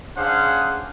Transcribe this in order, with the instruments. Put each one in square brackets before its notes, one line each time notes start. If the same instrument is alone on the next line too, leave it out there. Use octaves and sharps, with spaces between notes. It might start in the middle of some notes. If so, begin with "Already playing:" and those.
[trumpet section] C#4 D4 G#4 C5 F5 F#5